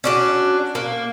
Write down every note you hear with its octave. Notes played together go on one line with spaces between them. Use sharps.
C#4 D4 F#4
A#3